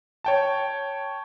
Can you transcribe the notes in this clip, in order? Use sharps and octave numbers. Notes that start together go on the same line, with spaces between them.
C#5 G5 A5